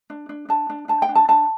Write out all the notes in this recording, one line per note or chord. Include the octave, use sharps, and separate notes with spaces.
D4
D4
D4 A5
D4
D4 A5
G5
D4
A5
D4 A5